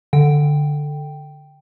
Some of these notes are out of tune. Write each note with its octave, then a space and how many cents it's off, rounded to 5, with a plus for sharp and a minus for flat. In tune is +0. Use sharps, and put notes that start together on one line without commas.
D3 +0 G5 +0